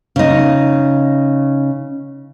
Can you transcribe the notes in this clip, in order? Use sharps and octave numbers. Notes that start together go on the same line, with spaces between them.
C#3 D#4